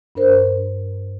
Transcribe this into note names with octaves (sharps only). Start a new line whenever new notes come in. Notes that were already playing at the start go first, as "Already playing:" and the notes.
G2 D4 A#4 C5